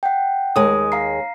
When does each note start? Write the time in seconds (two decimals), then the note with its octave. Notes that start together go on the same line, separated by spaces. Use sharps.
0.03 F#5 G5
0.56 D#2 G#3 D#6
0.92 F5 A#5 C7